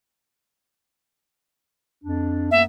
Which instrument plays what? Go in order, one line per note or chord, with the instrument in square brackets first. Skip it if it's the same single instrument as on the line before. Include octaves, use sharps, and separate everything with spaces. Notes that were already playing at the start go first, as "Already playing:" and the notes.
[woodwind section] F2 D4
[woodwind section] F#2 A#3 B3 [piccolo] E5